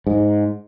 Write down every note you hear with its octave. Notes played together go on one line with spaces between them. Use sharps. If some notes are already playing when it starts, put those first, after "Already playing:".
G#2